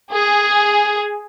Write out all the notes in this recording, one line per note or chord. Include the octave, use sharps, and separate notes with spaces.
G#4